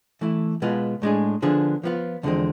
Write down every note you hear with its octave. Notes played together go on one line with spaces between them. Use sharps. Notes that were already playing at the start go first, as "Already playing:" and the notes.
E3 A3 E4
B2 G#3 B3 F4
A2 G#3 D4 G#4
D3 F3 B3 D4 G#4
F3 B3 F4
E2 D3 F3 G#3 C4